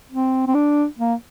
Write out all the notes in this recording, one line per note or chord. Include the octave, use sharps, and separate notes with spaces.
C4
C4
D4
A#3